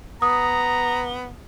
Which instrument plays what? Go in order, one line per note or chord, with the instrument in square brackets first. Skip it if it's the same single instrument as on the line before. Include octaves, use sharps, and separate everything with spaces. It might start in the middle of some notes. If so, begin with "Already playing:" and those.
[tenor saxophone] B3 [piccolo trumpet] A#5 [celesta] D#6